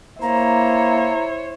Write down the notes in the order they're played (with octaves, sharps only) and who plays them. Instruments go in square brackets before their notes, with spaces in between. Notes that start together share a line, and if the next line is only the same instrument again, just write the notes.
[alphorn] A#3 [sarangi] E4 [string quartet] C5 C#5 [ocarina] A#5